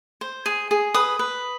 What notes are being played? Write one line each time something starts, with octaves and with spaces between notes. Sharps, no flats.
C5
G#4
G#4
B4 D#6
B4